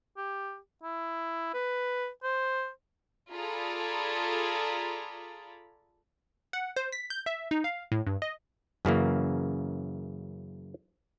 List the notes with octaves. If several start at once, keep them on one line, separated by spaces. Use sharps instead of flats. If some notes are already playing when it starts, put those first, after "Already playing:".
G4
E4
B4
C5
F4 G#4 A4 D5 A#5 B5
F#5
C5
B6
G6
E5
D#4
F5
A2
G2
D#5
F#2 C#3 E3 A#3